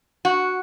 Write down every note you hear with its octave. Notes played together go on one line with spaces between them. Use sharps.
F#4